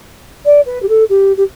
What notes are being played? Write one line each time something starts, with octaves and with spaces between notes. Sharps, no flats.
D5
B4
G4
A4
G4
G4